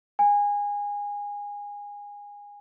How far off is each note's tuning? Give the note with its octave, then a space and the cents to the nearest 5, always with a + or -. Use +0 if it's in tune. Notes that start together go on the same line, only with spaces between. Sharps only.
G#5 -20